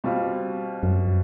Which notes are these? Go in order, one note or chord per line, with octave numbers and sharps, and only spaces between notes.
B2 G3 C4 F4
F#2